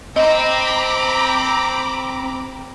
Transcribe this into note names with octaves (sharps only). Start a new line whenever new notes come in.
C4 C5 D#5 A#5 B5 D6